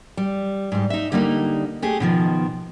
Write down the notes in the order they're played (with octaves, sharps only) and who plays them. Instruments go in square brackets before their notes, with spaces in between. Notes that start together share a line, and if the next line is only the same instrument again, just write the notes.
[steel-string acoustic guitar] G3
G#2 G3
D#4 E5
D3 G3 A#3 D#4
A3 G4 G#4
B2 D#3 F3